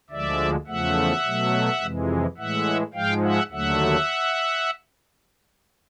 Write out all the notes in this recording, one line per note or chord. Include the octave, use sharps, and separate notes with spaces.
D2 D3 F3 G#3 D5 E5
E2 C#3 F3 A3 E5 F#5
B2 F#3 A3
F2 C3 E3 G#3
A2 E3 G#3 E5 F#5
G#2 F3 G#3 F5 G5
E5 F#5
D#2 D3 F#3 A3 E5 F#5